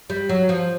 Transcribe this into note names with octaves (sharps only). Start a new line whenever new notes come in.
G3
F#3
F3